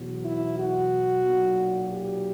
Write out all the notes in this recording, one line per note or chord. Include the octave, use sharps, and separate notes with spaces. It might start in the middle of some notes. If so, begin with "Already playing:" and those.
Already playing: E2 B2 F#3
E4
F#4
B1 A#2 F#3
G4